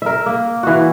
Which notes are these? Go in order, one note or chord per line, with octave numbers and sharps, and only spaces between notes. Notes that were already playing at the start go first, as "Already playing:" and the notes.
A#4 E5
A#3
E3 F#4